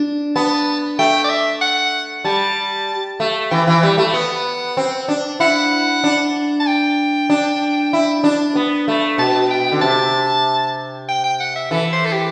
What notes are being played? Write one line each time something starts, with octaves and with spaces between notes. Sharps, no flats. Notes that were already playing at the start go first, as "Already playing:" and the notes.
Already playing: D4
B3 A5
A3 G5
D5
E5
F#5
G3 A5
A3
E3 G5
E3
G3
A3
B3 F#5
C4
D4
E4 F#5
D4
A5
G5
D4
E4
D4
B3
A3
B2 A5
G5
D3
C3 A5
G5
G5
F#5
E5
E3 A4
C5
A4
G4